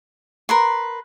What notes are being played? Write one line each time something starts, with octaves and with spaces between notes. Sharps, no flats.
A#4 B4 C6